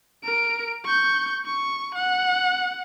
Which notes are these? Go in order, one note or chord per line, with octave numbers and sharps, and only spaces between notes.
A#4 D7
C#6 G6
C#6
F#5